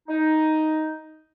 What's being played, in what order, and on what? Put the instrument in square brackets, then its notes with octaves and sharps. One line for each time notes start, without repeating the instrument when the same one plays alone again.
[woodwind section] D#4